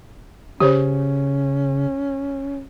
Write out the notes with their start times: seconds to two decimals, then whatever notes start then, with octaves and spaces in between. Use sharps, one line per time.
0.60 C#3 C#4 G4 C5 C#5